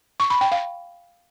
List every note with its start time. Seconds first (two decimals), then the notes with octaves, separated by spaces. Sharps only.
0.20 C#6
0.30 B5
0.41 G5
0.52 F5